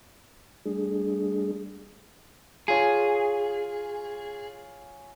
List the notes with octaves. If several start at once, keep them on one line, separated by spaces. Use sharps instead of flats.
G3 A3 D4 G#4
F4 G#4 C#5 G#5